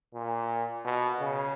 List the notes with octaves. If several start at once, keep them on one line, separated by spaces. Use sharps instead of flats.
A#2
B2
C#3